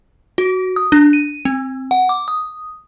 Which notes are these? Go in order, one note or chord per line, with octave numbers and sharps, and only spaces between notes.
F#4
D#6
D4
D#7
C4
F#5
D6
D#6